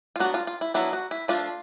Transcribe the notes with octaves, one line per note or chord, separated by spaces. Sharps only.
F4
F#3 B3 D4 F#4
F4
F4
E4
F#3 B3 D4 E4
F#4
E4
F3 A3 D4 F4